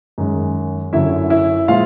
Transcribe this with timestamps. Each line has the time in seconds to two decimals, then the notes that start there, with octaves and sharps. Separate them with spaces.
0.18 F#2 D#3 G#3
0.93 F#2 D3 F#3 E4 E5
1.30 E4 E5
1.68 A#2 F3 G#3 F4 F5